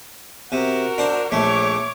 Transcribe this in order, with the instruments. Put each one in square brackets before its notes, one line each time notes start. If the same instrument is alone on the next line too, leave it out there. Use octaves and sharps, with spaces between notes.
[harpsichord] C3 [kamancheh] F#4 A#4
[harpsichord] D4 C5
[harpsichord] A#1 A3 [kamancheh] C#5 D6